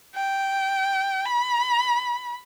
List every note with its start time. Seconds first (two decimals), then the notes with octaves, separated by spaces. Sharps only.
0.15 G5
1.25 B5